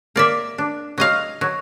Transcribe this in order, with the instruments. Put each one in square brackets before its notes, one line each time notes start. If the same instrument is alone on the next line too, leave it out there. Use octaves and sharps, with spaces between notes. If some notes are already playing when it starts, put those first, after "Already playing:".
[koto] A#3 D5 E5
D4
F#3 D#5 F5
F#3